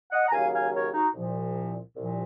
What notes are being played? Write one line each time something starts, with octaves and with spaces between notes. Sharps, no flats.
D#5 F#5
A#5
D#2 C#3 F#3 F5 G#5
F5 G#5
A#4 C#5
D#4 F#4
C2 A#2 F3
C2 A#2 F3